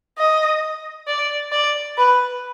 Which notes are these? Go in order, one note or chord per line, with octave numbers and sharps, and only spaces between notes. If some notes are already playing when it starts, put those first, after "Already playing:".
D#5
D5
D5
B4